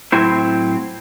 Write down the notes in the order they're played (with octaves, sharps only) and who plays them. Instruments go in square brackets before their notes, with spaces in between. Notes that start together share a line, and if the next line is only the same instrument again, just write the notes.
[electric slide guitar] A2 F#3 C4 E4 C5